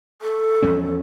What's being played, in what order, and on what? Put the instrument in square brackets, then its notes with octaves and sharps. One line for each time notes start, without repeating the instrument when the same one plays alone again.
[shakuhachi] A4
[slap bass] E2 F3 C#4